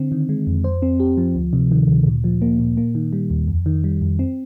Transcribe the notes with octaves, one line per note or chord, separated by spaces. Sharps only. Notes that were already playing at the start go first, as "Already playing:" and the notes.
Already playing: D3 C4
D#3
G#3
F2
C5
C4
G4
F3
D2
C3
D#3
D2
A#2
F3
A#3
A#2
A#3
D#3
G3
D#2
F2
D#3
G3
F2
C4